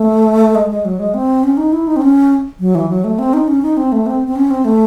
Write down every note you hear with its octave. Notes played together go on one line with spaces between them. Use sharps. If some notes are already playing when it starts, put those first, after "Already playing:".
Already playing: A3
G#3
G#3
F#3
G#3
C4
C#4
D#4
E4
D#4
C4
C#4
F#3
E3
F#3
A3
C4
D#4
C#4
D#4
C4
A3
C4
C4
C#4
C4
A3